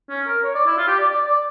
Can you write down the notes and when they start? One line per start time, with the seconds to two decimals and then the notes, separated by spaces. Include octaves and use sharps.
0.09 C#4
0.27 A#4
0.44 C#5
0.55 D5
0.66 E4
0.77 F4
0.87 G4
0.99 D5
1.10 D5
1.27 D5